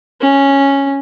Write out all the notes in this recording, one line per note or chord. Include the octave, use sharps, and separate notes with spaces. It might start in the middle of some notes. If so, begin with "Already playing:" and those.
C#4